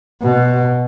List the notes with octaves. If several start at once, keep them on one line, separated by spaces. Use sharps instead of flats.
B2